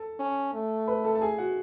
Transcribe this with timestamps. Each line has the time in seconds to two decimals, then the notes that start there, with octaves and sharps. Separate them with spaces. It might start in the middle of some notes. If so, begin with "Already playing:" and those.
Already playing: A4 A5
0.19 C#4
0.54 A3
0.87 B4 B5
1.04 A4 A5
1.15 A5
1.21 G#4 G#5
1.38 F#4 F#5